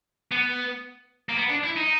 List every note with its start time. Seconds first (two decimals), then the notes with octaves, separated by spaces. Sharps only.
0.32 B3
1.29 A#3
1.37 B3
1.49 D4
1.64 E4
1.76 D#4